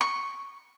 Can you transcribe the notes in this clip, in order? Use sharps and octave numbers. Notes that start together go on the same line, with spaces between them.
C#6